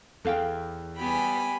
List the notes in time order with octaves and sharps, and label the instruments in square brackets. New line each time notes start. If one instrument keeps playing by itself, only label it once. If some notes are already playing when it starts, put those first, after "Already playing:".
[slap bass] E2 [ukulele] A4 F5 G5
[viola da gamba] G3 B3 G4 [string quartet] G#5 B5